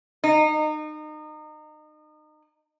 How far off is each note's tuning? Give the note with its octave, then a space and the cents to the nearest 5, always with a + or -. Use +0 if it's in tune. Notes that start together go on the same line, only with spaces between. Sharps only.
D#4 -30